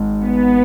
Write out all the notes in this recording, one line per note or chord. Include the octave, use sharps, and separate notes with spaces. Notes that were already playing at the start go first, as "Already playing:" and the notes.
Already playing: G#1 G#2 G#3
B3